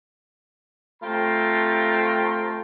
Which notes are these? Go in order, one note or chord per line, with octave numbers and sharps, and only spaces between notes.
C3 A3 F4 G5 A#5 C6